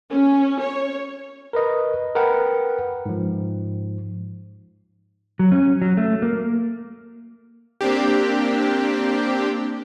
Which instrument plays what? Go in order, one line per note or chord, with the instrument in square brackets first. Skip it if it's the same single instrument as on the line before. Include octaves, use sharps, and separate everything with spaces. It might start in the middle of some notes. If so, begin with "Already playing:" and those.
[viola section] C#4
C#5
[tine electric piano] A#4 B4 D#5
A#4 B4 F#5 G5
G#2 F3
[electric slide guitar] F#3
C#4
F#3
A3
A#3
[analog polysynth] A#3 C4 D4 G4